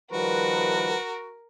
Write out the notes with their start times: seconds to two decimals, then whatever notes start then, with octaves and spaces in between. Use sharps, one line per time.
0.12 D#3 F3 G3 F#4 A#4 B4